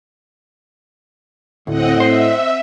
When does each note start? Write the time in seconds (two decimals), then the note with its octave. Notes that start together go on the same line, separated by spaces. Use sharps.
1.67 D2 A2 C4 D#5 F#5
2.00 C5 E5